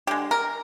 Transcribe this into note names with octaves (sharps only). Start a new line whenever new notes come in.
D3 G#3 G4
A#4